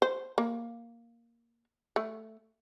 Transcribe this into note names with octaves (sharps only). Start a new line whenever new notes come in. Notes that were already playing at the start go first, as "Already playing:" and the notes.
C5
A#3
A3